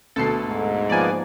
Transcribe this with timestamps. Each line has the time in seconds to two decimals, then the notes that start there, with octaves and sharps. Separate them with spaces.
0.16 D2 B2 A4 C7
0.47 G#2
0.90 F3 A#3 B3 D5 G#5